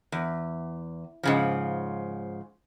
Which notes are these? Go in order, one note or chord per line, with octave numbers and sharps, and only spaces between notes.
E2
G#2 C#3 F3